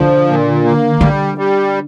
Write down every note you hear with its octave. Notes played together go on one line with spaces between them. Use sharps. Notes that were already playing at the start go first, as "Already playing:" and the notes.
Already playing: D3 F3
A#2
A#3
D3 G3
G3